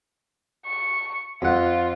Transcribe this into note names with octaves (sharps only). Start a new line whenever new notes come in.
C#6
F2 F4 F#5